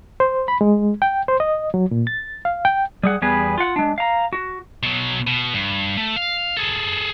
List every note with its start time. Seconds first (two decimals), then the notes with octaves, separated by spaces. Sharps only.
0.20 C5
0.48 B5
0.61 G#3
1.02 G5
1.28 C5
1.40 D#5
1.74 F#3
1.91 A#2
2.07 A6
2.45 F5
2.65 G5
3.03 G3 G#4 F#5
3.22 E2 G3 B3 G#4 B4
3.58 F4 F#5
3.76 G#3 D4
3.98 F5 A#5
4.33 F#4
4.83 B2 F#3
5.27 B2
5.53 G2
5.97 A3
6.16 F5
6.57 G#4 A4